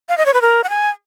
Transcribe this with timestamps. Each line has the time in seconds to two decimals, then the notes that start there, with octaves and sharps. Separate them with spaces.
0.09 F5
0.18 D#5
0.26 C#5
0.34 B4
0.42 A#4
0.64 F#5
0.70 G#5